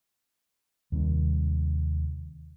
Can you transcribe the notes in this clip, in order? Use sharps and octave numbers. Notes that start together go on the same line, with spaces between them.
D#2 C3 G3